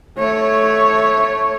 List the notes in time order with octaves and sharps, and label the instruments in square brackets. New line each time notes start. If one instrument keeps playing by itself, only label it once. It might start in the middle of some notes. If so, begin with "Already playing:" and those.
[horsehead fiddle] A3 C#5